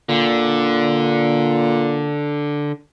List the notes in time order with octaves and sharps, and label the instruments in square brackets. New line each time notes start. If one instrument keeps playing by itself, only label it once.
[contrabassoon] A#2 [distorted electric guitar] D3